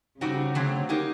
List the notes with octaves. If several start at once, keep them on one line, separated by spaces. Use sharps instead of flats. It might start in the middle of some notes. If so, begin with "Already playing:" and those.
C#3 G3 C4 D#4 F#4
D3 F#3 A3 C4
A#3 D#4 G4